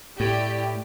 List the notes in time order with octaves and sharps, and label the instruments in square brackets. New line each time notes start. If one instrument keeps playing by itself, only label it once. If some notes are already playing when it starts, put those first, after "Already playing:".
[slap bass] A2 [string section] E4 G4 D5